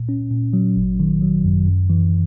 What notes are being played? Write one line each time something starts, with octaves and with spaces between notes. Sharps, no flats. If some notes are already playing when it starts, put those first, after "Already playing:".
Already playing: A#2
C#4
A#2
F#3
G#1
D#3
F#3
F#2
F#2
E3